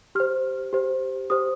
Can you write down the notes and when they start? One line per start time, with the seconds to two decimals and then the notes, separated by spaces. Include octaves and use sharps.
0.15 G4 C5 F6
0.73 G4 C5
1.30 G4 C5 D#6